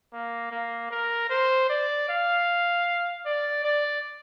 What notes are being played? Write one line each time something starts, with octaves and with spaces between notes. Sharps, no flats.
A#3
A#3
A#4
C5
D5
F5
D5
D5